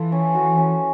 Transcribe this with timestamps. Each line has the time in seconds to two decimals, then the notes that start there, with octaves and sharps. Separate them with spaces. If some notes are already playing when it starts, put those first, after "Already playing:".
Already playing: E3 F4 A4
0.12 C#4
0.35 F#4
0.57 C#4